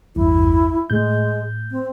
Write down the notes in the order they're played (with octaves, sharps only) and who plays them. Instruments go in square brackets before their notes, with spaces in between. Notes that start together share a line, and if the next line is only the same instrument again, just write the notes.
[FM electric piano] A1 E2 G2 [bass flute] E4
[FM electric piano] A2 G6 [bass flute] G#3
[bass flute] C4